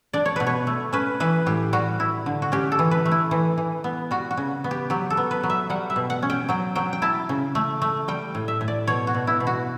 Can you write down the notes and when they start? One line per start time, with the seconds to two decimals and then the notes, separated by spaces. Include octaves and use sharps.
0.13 D4 D5
0.26 C#5
0.36 B2 B4
0.47 C#5
0.67 A3
0.93 C#4 B4
1.20 E3 B4
1.46 A2 G4
1.73 G3 F#4
2.00 E4
2.26 D3
2.42 F#4
2.52 C#4 G4
2.72 A4
2.79 E3
2.91 B4
3.05 A3
3.12 E4
3.31 E3
3.58 E3
3.84 B3
4.11 G3 F#4
4.31 F#4
4.37 C#3
4.64 B3
4.71 G4
4.90 F#3 G4
5.10 A4
5.17 B3
5.31 B4
5.43 F#3
5.50 E5
5.70 G3 F#5
5.90 E5
5.96 B2
6.10 F#5
6.22 C#4
6.30 G5
6.49 F#3 G5
6.75 F#3 G5
6.93 G5
7.02 E4 A5
7.29 C#3
7.55 A3
7.82 A3
8.08 G3 G5
8.35 A2
8.48 E5
8.61 A2
8.68 D5
8.87 B2 C#5
9.07 F#4
9.15 B2
9.27 E4
9.40 B2
9.47 F#4